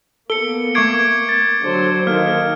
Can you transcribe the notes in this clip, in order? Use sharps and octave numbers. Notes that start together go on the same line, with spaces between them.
A#3 B3 A4 C#7 G7
A3 C#6 D6 G#6 C7 D7
A6
D3 F#3 C5
D#3 A#3 A4 F6